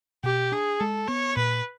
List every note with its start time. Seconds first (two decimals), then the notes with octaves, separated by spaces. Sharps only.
0.24 B2 G4
0.52 D4 G#4
0.80 G#3 A4
1.08 B3 C#5
1.36 A#2 B4